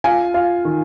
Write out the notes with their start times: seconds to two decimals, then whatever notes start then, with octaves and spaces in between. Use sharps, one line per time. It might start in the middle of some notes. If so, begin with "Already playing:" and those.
0.04 F4 G#5
0.34 F4
0.65 D#3